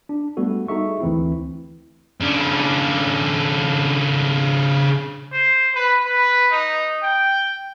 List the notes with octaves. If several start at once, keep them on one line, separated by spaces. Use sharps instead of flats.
D4
G3 A3 B3 F#4 A4
D#4 G#4 A4 E5 C#6
D2 E3 C4 E4
C#3 D4
C5
B4
B4
D#4
G5